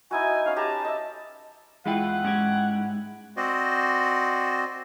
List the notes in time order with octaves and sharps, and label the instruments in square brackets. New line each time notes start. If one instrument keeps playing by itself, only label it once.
[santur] D#4 E4 F#4 [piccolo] G#5
[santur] C#4 D#4 [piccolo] F5
[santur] G4 B4 A#5 [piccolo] A5
[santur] D#5 E5
[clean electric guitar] E2 F4 B4 [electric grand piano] G#3 E4 G5 [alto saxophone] F#5
[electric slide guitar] G#2 [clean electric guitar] C#4 G4 C#5
[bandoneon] C4 F#4 C5 D5 D#5